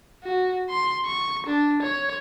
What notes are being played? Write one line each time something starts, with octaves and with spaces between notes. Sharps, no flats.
F#4
C6
C#6
D4
C#5